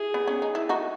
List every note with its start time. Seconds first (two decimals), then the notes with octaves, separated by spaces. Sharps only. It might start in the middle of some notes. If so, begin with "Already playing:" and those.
Already playing: E4 G#4
0.14 B3
0.27 C#4
0.42 D#4
0.55 E4
0.69 D#4 F#4